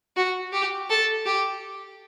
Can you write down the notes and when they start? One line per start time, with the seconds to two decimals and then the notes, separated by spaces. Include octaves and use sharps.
0.17 F#4
0.53 G4
0.90 A4
1.26 G4